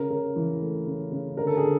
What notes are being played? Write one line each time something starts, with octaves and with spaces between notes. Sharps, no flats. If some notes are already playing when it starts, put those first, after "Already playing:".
Already playing: C#3 A#4
C#3
E3
A3
C#3
C#3
D3 A#4
A4
G#4
D3